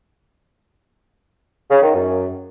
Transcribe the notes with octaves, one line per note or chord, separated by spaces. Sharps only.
C#3
D#3
F#2